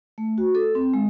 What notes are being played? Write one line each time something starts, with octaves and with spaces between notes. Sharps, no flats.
A3
F#4
A4
C4
G#3